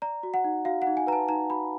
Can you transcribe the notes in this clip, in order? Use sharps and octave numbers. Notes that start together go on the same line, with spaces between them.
D5 A#5
F#4
F#5
D#4
F#4 F5
F#5
D#4
G#5
B4 A#5
A5
D#4 A#5
F#4 B5